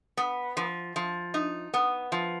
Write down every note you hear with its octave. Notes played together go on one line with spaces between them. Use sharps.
B3
F3
F3
D#4
B3
F3